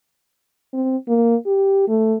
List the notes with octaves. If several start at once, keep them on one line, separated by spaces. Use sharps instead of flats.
C4
A#3
G4
A3